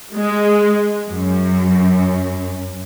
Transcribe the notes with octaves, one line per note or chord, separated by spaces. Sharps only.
G#3
F#2